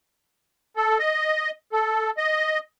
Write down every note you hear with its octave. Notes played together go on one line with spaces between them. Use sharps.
A4
D#5
A4
D#5